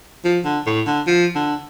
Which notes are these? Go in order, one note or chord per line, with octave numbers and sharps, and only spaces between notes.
F3
D3
A2
D3
F3
D3